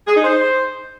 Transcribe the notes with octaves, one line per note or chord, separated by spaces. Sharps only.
G#4
D#4
C5